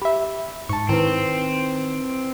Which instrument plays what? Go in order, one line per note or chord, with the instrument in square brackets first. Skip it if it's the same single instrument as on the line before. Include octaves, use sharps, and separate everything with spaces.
[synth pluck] G4 E5 [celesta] B5
[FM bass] G#2 [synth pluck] A5 C#6
[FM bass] D#3 [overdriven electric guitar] C4 [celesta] E4 B4